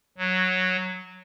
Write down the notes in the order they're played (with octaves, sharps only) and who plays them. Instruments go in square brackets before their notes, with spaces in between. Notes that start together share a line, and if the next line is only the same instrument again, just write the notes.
[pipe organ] F#3